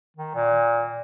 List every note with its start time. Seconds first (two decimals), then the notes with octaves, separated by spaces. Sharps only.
0.17 D#3
0.35 A#2